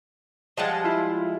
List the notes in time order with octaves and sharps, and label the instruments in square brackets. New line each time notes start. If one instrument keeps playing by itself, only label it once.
[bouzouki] F3 G3 G#3 [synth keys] D#5 F#5 A5
[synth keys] E4 F4